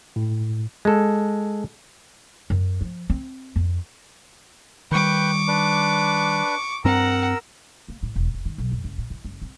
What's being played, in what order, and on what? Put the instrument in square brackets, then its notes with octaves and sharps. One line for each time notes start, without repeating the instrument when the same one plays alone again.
[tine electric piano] A2
[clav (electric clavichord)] G#3 A4
[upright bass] F#2
F3
C4
F2
[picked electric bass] D#3 G3 [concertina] B4 G5 [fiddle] C#6 D6
[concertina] D4 B4
[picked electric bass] G2 C4 [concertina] A#4 A#5 E6 [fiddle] F#5
[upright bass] A#3
A2
E1
F1
D#3
B1
F2
F#1
A2
E3
F#1
C4